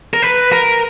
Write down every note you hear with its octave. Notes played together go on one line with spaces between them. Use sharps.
A#4
B4
A#4